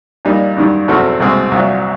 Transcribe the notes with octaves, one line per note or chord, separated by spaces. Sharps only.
A#2 G3 A#3 D#4
F#2 D#3 G3
E2 B2 F#3 A3 C4
C2 B2 G#3 C4
C2 A#2 F#3